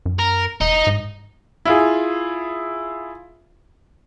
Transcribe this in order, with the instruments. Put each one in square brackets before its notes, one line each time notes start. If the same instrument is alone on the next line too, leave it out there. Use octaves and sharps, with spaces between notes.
[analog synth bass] F#2
[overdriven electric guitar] A#4
[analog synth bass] E1 [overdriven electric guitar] D#4
[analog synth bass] G#2
[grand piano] E4 F4 G#4